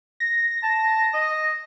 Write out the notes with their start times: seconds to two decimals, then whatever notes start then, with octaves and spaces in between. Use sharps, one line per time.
0.20 A#6
0.63 A5
1.14 D#5